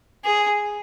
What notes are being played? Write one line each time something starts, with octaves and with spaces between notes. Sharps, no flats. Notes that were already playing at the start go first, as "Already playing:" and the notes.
G#4